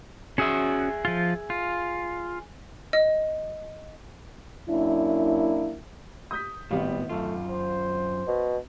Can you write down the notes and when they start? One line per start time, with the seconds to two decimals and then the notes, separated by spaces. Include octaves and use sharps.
0.38 C#4 F#4 G#4 E5 D#6
1.05 F3 F4
1.50 F4
2.93 D#5
4.69 F#2 A#3 D4 E4
6.31 D#6 G6 B6
6.71 G#1 A2 G3 B3 F5
7.09 F#2 A3 F4
7.49 C5
8.27 B2